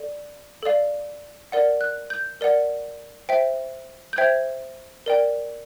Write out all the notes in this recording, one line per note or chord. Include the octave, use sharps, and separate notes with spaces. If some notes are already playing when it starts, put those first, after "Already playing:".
Already playing: A4 D5
A4 D5 F5
A#4 D5 F#5
F#6
G6
A#4 D5 F#5
C5 E5 G5
G6
C5 E5 G5 G#6
A#4 D5 G5